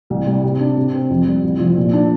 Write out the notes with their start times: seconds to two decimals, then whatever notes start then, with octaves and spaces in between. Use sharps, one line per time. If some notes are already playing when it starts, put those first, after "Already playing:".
0.10 C2
0.27 G3
0.43 C3
0.60 D4
0.77 C3
0.94 C4
1.10 F2
1.27 G3
1.44 C2
1.60 F3
1.77 A#2
1.93 D4